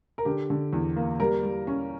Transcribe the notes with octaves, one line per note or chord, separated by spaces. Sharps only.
A#4
D3 G4
D3
E2
A#3
G3 A#4
G3
C#4